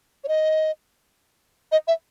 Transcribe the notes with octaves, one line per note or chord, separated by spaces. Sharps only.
C#5
D#5
D#5
E5